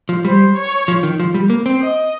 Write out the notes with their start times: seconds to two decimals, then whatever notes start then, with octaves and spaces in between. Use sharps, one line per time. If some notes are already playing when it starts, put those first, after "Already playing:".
0.09 F3
0.25 G3 C5
0.56 C#5
0.88 F3
1.03 D#3
1.20 F3
1.34 G3
1.50 A#3
1.66 C4
1.82 D#5